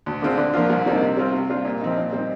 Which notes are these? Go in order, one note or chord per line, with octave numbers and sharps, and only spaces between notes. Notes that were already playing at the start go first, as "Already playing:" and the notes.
D2
D3 G#3 C4 F4
D3
F3 A#3 D4 F4
C2
C3 G3 A#3 D#4
C3
G3 C4 F4
C3
G3 D4 F4
A#2
F3 C4 D#4
A#2
G3 C4 D#4